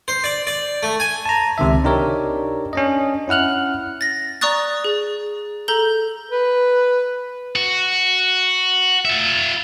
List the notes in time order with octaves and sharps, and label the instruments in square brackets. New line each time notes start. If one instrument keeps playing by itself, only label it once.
[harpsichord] C5
D5
D5
A3
G#5
[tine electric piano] A5 A#5
C#2 C3 D#3 E5
D4 D#4 G4 A#4 C#5 D5
C#4 D4 D#5
C#4 E4 F#5 F6 F#6
[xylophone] A6 A#6
D5 A#5 C#6 D#6 F#6 A6
G#4
A4 A#5 G6 G7
[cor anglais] B4
[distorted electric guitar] F#4
F4 E5